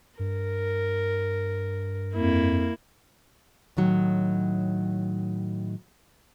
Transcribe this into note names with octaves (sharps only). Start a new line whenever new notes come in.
G2 A#4
F2 A#3 E4
A2 D#3 F#3